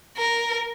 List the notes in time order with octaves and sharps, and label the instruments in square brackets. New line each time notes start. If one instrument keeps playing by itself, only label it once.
[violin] A#4